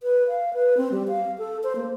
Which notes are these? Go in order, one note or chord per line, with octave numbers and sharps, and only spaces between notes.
B4
F5
B4
C4
G3
F5
A4
C5
A#3